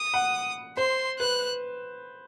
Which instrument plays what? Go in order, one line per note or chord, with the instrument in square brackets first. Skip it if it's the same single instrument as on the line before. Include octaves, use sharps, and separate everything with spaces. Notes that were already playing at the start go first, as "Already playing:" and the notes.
Already playing: [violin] D#6
[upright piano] F#5
[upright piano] C5 [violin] C6
[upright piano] B4 [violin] F#6